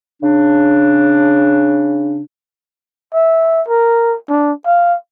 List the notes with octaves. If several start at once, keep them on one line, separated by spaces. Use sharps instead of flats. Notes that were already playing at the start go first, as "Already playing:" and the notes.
C#3 D4
E5
A#4
D4
F5